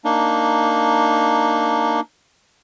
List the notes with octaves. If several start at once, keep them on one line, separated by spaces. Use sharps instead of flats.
A#3 D4 D#4